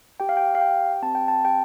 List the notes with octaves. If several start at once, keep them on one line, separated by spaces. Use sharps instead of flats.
G4 G5
F5
G5
F5
G4 G5
C4 A5
G5
A5
G4 G5